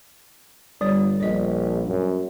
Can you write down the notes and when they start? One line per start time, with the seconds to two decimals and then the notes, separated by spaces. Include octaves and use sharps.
0.81 G1 G3 C#5
1.20 A#1 D5 D#5
1.87 F#2